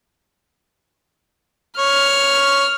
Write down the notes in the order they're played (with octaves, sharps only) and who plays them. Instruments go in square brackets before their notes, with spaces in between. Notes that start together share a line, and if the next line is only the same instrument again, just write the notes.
[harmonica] C#5 [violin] F6